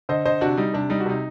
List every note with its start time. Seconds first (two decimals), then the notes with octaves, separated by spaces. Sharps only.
0.09 D3 C5 D#5
0.25 D3 C5 D#5
0.41 C3 D4 F#4
0.57 G3 D#4
0.74 C3 D4
0.90 G3 D#4
1.00 F#4
1.06 C3 D#4